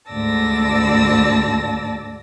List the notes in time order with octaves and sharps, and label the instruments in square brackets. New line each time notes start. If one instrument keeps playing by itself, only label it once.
[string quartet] D2 G#2 D5 A5 E6 A#6